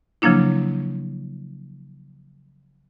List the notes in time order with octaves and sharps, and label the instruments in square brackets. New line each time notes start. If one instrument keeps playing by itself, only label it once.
[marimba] C#3 F3 F#3 A#3 D4 E4